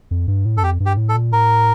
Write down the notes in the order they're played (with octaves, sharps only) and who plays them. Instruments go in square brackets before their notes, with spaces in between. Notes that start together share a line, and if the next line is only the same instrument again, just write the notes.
[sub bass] F2
G2
A2
[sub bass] G2 [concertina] A4
[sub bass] F2 [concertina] G4
[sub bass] G2
[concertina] G4
[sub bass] A2
[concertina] A4
[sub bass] A#2
[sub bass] A2 [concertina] A#4